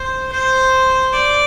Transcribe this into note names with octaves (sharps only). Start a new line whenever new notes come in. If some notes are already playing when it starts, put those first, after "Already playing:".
Already playing: C5
C5
D5